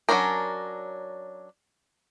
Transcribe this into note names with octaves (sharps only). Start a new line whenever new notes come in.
F#3 G#3 C#4 D4 A#4